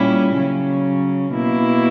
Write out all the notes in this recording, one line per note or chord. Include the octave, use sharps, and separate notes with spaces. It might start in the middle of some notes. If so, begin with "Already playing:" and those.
Already playing: A#2 G3 C#4 E4
C#3 F#3 C#4
B2 A#3 E4